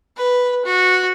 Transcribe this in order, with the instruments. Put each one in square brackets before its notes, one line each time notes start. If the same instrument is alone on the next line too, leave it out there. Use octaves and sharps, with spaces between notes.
[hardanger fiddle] B4
F#4